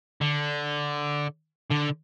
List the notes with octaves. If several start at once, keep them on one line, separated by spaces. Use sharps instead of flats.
D3
D3